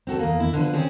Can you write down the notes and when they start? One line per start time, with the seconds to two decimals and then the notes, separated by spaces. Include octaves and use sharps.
0.07 C4 F#4 A4
0.19 E2 A#3
0.40 E4
0.53 D3 F3 B4
0.74 C4 C#4 G#4